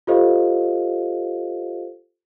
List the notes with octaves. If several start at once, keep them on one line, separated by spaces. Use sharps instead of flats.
F4 G4 A4 C5 D#5 F5